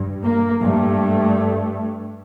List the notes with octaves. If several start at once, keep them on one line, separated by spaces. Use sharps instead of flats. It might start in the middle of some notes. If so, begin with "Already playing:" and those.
Already playing: G2
A#3
G2 A3